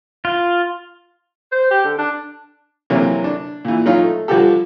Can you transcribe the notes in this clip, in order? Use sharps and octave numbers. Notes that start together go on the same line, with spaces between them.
F4
C5
G4
D3
D4
C3 E3 F#3 A#3
D4
A#2 E3
F#3 C#4 D#4 F4
A3
D3 F3 G3 F#4 G4 A4